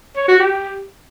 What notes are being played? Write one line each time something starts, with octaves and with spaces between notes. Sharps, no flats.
C#5
F#4
G4